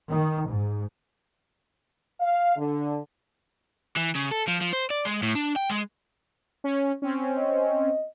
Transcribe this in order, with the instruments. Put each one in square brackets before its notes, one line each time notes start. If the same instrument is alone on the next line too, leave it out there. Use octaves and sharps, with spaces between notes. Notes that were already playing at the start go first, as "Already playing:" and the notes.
[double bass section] D#3
G#2
[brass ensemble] F5
D3
[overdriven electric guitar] E3
C#3
A4
F3
F3
C5
D5
G#3
A2
D4
G5
G#3
[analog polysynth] C#4
C4 C#4
[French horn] D#5